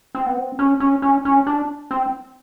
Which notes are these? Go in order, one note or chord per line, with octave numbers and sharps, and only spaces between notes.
C4
B3
C4
C#4
C#4
C#4
C#4
D4
C4